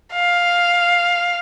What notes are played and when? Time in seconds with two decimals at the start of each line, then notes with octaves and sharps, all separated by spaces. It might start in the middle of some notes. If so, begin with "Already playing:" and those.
0.13 F5